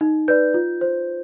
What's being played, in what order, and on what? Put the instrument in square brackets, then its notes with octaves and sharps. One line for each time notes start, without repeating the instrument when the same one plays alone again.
[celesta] D#4
B4 D5 G6
F4
C5